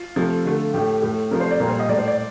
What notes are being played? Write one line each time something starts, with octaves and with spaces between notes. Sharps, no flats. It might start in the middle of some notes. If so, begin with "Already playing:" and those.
Already playing: F4
C3 F3 A3
D3 A3
A2 A3 G4
A2 A3
C3 F3 A3 A#4
C5
D5
A#2 G3 A#4
C5
D#5
A2 A3 D5
C5
D5